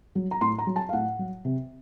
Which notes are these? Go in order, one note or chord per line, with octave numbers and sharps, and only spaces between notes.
F#3
A#5
A2 C6
A#5
F#3
A5
F5
A2 F#5
F#3
C3